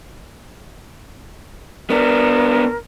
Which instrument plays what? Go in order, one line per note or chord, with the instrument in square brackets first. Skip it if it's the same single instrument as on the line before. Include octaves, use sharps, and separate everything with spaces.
[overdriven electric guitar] B3 D4 [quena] A#4